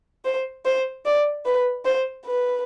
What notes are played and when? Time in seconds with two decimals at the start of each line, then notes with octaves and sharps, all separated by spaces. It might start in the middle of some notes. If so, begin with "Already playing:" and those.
0.25 C5
0.65 C5
1.05 D5
1.45 B4
1.85 C5
2.26 B4